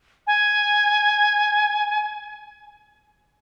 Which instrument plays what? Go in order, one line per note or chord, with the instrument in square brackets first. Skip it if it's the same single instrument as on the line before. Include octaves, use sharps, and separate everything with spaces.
[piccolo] G#5